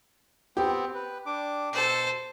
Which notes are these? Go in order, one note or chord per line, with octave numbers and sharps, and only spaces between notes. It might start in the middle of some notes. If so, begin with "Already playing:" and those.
B3 C4 G4
B4
D4 D6
B2 A4 C5